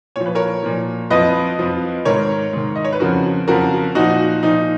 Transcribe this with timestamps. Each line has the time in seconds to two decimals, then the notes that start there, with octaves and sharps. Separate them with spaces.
0.16 A#2 F3 C#5
0.26 B4
0.35 A#4 C#5
0.63 A#2 F3
1.10 F2 F3 B4 D#5
1.59 F2 F3
2.05 G#2 D#3 A#4 C#5
2.53 G#2 D#3
2.75 D#5
2.84 C#5
2.93 B4
3.00 F2 C#3 F3 F#4 A#4
3.48 F2 C#3 F3 F#4 A#4
3.95 A#2 F3 D#4 F#4
4.43 A#2 F3 D#4